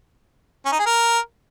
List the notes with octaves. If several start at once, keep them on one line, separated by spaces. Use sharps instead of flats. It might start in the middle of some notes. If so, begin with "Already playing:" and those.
C#4
D#4
G#4
A#4